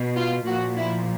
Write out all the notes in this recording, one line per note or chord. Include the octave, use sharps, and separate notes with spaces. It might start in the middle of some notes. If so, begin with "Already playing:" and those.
Already playing: B2
F4
A#2 F3 F#4
E4